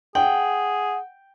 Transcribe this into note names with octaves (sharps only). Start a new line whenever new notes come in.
G#4 F#5 G5